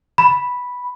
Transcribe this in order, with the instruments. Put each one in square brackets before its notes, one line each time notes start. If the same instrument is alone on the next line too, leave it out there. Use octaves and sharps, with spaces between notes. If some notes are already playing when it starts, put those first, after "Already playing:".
[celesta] B5